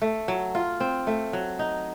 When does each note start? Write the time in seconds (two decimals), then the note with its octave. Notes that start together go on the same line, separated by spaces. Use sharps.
0.02 A3
0.28 F#3
0.55 F4
0.80 C4
1.07 A3
1.33 F#3
1.59 D#4